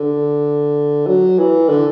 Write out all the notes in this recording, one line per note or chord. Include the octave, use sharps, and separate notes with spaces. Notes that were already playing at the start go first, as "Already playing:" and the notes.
Already playing: D3
F#3
E3
D3